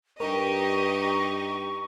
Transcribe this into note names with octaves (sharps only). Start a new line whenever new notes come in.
G2 D#4 G4 A#4 D#5 C#6